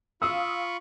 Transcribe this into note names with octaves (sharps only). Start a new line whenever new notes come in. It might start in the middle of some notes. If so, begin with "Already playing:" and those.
F4 F5 B5 C#6 D#6 E6